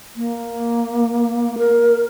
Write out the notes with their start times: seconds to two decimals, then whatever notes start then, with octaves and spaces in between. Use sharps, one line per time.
0.16 A#3
1.58 A#4